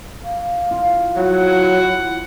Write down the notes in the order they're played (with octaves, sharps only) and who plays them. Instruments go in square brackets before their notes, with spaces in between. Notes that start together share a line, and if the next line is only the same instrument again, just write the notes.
[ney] F5
[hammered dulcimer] F4
[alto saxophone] F#3 [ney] E4 [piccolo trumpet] F#5